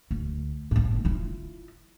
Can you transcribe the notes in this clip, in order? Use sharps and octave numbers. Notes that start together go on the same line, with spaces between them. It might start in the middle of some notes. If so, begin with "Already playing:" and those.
D2
G1 A2
E4 F4